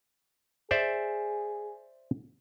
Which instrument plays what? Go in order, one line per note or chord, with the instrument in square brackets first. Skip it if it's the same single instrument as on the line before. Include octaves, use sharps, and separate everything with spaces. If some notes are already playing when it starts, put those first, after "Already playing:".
[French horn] G#4 [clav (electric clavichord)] C5 D5 E5